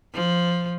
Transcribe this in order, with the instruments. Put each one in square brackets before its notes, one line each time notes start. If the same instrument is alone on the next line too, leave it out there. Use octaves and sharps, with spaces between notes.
[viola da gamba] F3